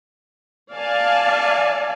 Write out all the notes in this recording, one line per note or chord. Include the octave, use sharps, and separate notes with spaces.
D5 F5 G#5 A5